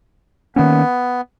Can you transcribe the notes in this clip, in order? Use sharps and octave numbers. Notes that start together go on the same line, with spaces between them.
D#3 A#3 B3 C#4